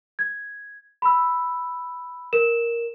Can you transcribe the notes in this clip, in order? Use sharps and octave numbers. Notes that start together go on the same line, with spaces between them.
G#6
B5 E6
A#4 E7